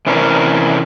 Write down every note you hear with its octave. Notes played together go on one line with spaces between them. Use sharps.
C3 E3 C#4 D4 A#4